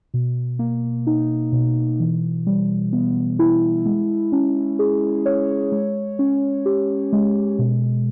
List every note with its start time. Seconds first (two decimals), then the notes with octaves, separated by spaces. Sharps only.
0.14 B2
0.59 A#3
1.07 D#4
1.52 B2
2.00 E3
2.47 G3
2.93 B3
3.39 E4
3.86 G#3
4.32 C#4
4.79 G#4
5.26 C#5
5.72 G#3
6.19 C#4
6.66 G4
7.13 G#3
7.59 B2